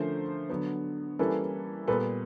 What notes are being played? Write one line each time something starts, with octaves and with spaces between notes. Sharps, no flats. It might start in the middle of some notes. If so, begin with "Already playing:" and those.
Already playing: D3 F3 A3 C#4 A#4 C5
D3 F#3 B3
E3 G3 A#3 C#4 A4 B4
A#2 G3 B3 A4 B4